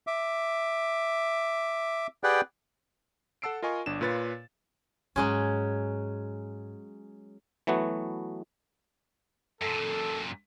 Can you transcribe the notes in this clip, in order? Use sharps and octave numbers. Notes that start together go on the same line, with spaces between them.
E5 D6
G4 G#4 B4 D5 F#5 G5
A4 F#5 A5 E6 C7 D7
F4 A#4 D#5 G#5 C#6
G1 D4 E7
A#2 F4 B4 C#5 A6
G#2 F#3 G#3 C#4
E3 F#3 A3 B3 F#4
F#2 A#2 A4